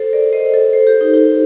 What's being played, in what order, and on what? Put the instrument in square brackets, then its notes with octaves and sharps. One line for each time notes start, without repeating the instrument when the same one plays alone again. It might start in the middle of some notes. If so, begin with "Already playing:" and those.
Already playing: [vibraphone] A4 C5
A#4 D5
C5 D#5
A4 C5
A4 C5
G4 A#4
D#4 G4
D#4 G4